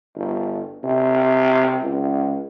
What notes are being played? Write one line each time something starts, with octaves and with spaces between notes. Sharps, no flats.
G1
C3
C#2